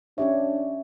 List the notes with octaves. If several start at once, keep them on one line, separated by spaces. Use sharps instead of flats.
C#4 D4 G4 C#5 E5